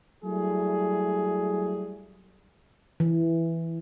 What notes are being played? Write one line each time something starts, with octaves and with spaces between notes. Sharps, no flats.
F#3 G3 A3 E4 G#4
E3